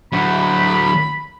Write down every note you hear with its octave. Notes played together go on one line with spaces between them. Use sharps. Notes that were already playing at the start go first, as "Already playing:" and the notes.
D2 F#3 B5